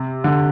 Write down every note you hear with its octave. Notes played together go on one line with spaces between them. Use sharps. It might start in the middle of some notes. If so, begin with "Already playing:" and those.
Already playing: C3
D3